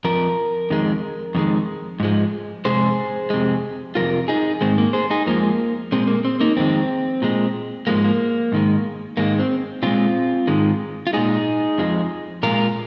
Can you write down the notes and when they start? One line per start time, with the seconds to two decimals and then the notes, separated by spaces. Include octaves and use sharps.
0.04 F2 F3 A#4
0.70 F2 D#3 G#3
1.35 F2 D#3 G#3
2.00 G#2 F3 G#3
2.65 F2 C3 G#3 G#4 C5
3.30 F2 C3 G#3
3.95 F2 C3 D#3 G#3 F4 A#4
4.28 D#4 G#4
4.61 G#2 D#3 G#3 C4
4.78 A#3
4.93 G#4 C5
5.10 D#4 G#4
5.27 F2 F3 G#3 A#3
5.92 A#2 G#3 C4
6.07 A#3
6.25 C4
6.40 A#3 D#4
6.57 F2 D#3 G#3 C4
7.22 A#2 G#3
7.87 G#2 F3 G#3 A#3
8.04 A#3
8.52 G#2 D#3 G#3
9.17 G#2 D#3 G#3 A#3
9.39 C4
9.82 A#2 F3 G#3 C4 F4
10.47 G#2 D#3 G#3
11.07 F4
11.13 A#2 G#3 D#4 G#4
11.78 F2 F3 G#3
12.43 A#2 G#3 F4 A#4